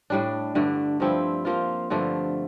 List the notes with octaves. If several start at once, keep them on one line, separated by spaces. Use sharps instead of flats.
A2 G3 D4
G2 D3 A3 D4
G2 F3 C4 E4
F3 A#3 F4
G2 D3 F3 A3